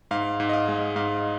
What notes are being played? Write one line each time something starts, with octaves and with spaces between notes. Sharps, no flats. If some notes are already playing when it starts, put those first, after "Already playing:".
G#2 F5
G#2
D#5
F5
G#3
G#2 F5